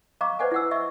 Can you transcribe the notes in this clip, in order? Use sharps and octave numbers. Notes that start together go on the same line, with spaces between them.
D#5 F5 A#5 C#6 D6
B4 C5 D5 E5 F#5 G#5
E4 F#5 E6
D#5 E5 C#6